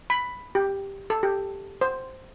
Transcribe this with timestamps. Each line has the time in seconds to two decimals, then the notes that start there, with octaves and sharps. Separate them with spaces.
0.10 B5
0.55 G4
1.10 A4
1.23 G4
1.81 C5